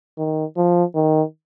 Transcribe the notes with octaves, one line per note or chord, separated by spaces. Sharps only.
D#3
F3
D#3